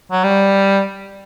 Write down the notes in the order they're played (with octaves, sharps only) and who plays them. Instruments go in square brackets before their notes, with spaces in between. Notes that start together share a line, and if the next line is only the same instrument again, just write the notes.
[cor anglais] F#3
G3